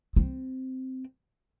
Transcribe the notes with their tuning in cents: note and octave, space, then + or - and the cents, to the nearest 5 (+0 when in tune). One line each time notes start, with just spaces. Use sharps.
C4 -10